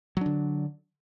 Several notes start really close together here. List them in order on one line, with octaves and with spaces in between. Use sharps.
F#3 D4 D3